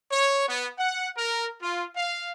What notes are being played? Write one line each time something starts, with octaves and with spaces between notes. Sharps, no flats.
C#5
B3
F#5
A#4
F4
F5